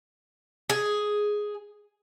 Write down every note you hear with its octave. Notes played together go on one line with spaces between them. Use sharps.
G#4